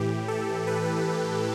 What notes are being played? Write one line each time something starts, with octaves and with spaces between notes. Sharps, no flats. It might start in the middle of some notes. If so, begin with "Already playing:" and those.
Already playing: A2 E3 G4
A4
B4